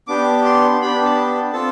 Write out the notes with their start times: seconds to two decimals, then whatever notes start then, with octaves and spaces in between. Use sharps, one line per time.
0.07 B3 D4 G4 D6
0.45 C6
0.81 B3 D4 G4 B5
1.04 A5
1.53 C4 F4 A4 A5